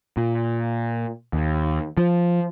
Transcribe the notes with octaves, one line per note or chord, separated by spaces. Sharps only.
A#2
D#2
F3